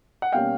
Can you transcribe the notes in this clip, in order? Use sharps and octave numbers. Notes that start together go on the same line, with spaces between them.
F#5
B2 G3 A#3 C#4 F5 G5